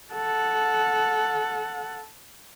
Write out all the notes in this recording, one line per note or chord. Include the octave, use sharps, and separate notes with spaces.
A4 F#5